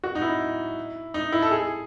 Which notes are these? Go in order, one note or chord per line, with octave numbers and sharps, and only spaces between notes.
F#4
D#4
E4
D#4
E4
A4
G#4